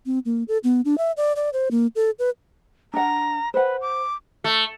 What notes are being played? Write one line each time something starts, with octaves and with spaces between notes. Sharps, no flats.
C4
A#3
A4
B3
D4
E5
D5
D5
C5
A#3
A4
B4
D4 F#5 A#5
B4 C5 F#5
D6
A3